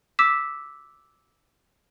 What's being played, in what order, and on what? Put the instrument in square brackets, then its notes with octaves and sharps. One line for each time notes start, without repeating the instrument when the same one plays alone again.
[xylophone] D6 E6 B6 E7